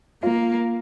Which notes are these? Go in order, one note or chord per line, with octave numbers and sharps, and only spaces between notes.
A#3 F4